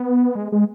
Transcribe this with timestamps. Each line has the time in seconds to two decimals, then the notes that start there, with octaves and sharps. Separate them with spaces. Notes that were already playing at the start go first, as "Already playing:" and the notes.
Already playing: B3
0.35 G#3
0.52 G#3